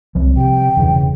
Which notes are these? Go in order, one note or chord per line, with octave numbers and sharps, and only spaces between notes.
C2 F3 G3 C4
C3 G5
E1 G2 C#3 E3